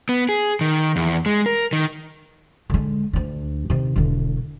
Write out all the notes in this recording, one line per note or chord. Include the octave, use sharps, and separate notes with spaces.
B3
G#4
D#3
E2
G#3
A#4
D#3
D3 G#3
D2 D3
C3 D#3
E1 D3